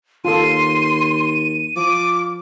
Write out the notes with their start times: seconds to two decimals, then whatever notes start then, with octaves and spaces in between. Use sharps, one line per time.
0.25 D#2 F4 A4 C6 D#7
1.76 F3 D6